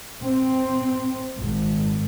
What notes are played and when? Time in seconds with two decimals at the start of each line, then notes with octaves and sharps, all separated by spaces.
0.22 C4
1.39 G#1